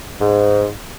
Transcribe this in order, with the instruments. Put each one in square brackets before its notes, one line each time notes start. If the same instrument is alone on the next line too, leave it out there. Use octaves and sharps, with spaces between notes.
[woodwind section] G#2